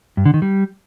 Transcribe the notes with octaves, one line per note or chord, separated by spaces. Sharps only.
G2
D3
D#3
G3